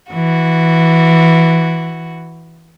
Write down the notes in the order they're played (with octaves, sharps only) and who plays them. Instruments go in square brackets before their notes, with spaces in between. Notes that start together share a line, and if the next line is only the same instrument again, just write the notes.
[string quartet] E3 F#4